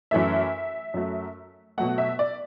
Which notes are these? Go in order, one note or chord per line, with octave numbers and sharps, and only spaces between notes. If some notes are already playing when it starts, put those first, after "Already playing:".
F#2 E3 A3 E5
F#2 F#3 A3
B2 F#3 A3 F#5
E5
D5